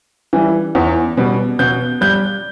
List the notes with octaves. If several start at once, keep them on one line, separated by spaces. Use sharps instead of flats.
E3 G3
E2
B2 G3
B2 G6
G3 G6